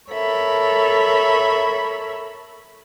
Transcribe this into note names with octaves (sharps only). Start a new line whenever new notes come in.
A4 A#4 C#5 E5 B5